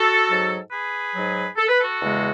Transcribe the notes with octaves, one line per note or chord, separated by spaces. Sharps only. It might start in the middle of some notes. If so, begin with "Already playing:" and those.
Already playing: F#4 A4
G#2 F#3
G#4 B4
G#2 F#3
A4
B4
F#4 A4
E2 C#3 G#3